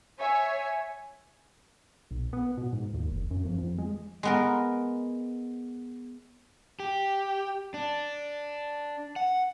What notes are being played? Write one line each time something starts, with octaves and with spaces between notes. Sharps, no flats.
C#5 E5 G#5
B1
B3
B2
G#2
D#2
F#1
F#2
F2
F2
G#3
G#3 B3 A#4
G4
D4
F#5